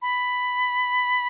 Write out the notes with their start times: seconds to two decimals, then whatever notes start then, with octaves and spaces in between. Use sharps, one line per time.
0.02 B5